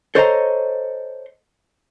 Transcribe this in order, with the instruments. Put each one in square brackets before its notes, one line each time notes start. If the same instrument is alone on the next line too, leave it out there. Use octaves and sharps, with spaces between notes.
[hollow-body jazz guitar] A4 C5 C#5 D#5 F#5 A#5